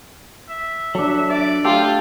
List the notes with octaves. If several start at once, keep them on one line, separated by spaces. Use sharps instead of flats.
E5
F#3 D4 A4
D5 E5
A3 F4 G4 A4